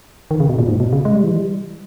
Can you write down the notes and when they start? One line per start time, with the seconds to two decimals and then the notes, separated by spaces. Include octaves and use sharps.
0.31 D#3
0.40 C#3
0.49 B2
0.59 A#2
0.68 G#2
0.80 B2
0.93 C#3
1.05 G#3
1.14 G3
1.23 E3
1.31 G3